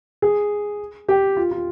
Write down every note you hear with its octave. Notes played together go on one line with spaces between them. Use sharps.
G#4
G4
F4
F4